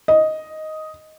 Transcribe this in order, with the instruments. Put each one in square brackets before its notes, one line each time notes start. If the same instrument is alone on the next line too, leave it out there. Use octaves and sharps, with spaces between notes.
[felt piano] D#5